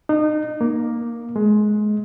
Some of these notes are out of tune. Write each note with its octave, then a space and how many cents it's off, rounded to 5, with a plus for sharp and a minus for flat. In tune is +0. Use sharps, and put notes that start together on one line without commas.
D#4 -30
A#3 +5
G#3 +20